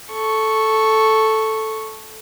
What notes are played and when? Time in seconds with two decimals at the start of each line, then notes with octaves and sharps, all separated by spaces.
0.12 A4 C#6